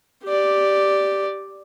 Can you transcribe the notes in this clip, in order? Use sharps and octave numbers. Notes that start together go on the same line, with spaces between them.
G4 D5